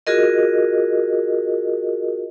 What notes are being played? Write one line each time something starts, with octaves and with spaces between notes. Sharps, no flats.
F4 F#4 G#4 A#4 D#5